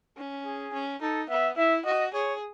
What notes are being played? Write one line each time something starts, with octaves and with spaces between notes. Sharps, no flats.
C#4
G#4
C#4
D#4 A4
B3 E5
E4 E5
F#4 D#5
G#4 C#5